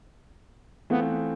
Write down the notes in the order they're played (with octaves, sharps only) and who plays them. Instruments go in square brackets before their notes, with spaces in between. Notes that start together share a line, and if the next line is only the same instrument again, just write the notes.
[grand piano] E3 A3 C4 F4 [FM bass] B3